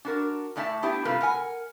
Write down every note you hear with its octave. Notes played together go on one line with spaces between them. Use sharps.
D4 F#4 A#4
A2 A3 D4 D5 E5 A5
B3 D4 E4 G4
G2 C3 A3 F4 B4
A#4 F#5 G#5